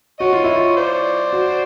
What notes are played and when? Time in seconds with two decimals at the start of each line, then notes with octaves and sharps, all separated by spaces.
0.20 F#4 C#5 D#5
0.33 F4
0.44 E4
0.56 F4
0.77 C5 D5
1.33 F#4